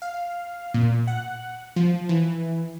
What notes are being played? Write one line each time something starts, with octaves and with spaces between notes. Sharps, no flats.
F5
A#2
F#5
F3
E3